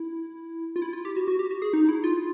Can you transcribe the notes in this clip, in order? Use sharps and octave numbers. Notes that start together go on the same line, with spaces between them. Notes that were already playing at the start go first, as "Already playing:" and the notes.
Already playing: E4
F4
E4
F4
G4
F#4
F#4
G4
F#4
G#4
D#4
E4
F4